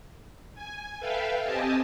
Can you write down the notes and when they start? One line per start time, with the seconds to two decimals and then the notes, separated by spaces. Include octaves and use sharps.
0.55 G#5
0.99 A4 B4 E5 F5 G5
1.41 C4 G4 D#5 G#5 A5